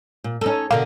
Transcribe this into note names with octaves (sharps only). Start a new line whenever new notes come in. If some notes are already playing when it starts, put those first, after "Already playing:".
A#2
C#4 D#4 A4
B2 D3 A#4 F5